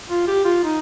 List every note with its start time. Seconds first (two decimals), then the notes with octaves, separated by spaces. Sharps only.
0.10 F4
0.28 G4
0.45 F4
0.64 D#4